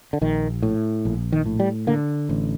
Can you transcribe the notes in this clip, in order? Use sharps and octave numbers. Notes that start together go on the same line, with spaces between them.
D3
A#1 D#3
A2
A#1
D#3
A2
G3
D3 A#3
A1